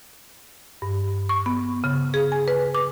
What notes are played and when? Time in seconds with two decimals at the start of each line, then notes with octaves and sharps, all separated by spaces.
0.82 G2
1.29 C#6
1.46 B3
1.84 C#3
2.14 G#4
2.32 G#5
2.48 B4
2.74 D6